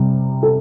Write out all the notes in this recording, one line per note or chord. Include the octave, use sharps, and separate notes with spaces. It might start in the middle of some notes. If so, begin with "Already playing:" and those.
Already playing: C3 G3
A4